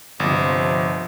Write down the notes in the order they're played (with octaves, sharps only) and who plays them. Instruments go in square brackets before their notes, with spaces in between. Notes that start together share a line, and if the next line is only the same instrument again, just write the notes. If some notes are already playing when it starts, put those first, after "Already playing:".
[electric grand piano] G1 [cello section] C3 F3